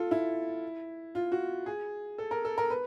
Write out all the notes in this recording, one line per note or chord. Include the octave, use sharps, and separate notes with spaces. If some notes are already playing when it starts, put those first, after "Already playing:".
Already playing: F4 A4
E4
F4
F#4
G#4
A4
A#4
A4
A#4
B4